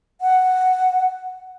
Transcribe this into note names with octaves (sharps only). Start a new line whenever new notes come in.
F#5